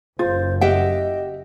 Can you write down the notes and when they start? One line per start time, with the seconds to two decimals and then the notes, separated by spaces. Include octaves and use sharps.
0.19 F#1 F4 C5
0.61 G4 D#5 E5 F#5 G5